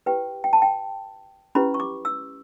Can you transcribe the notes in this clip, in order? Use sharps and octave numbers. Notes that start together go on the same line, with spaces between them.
E4 G4 B4 G5
G5
A5
G5
C#4 E4 G4 B4 B5
C#6
D6
E6